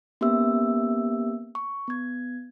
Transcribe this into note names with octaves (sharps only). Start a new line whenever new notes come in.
A#3 B3 C#4 G4 E5 E6
C#6
B3 G#6